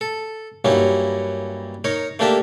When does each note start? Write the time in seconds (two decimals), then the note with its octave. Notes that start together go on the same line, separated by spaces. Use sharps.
0.01 A4
0.65 G2 F#3 A#3 C#4 D#4 E4
1.84 D#4 A#4 C#5
2.19 A3 A#3 D4 G4 A#4 E5